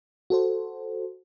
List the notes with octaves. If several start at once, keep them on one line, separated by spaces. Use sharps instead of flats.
F#4 A4 C5